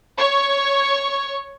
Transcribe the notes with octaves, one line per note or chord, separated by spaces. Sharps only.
C#5 C#6